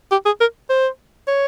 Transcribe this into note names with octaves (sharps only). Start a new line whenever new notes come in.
G4
G#4
A#4
C5
C#5